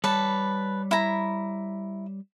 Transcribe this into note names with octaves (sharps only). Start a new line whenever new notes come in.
G3 B4 C#5 A5
E4 A#5